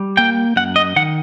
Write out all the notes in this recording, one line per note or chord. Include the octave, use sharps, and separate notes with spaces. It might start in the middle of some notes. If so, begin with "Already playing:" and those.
Already playing: G3
A#3 G5
F#2 F#5
D#5
D#3 F#5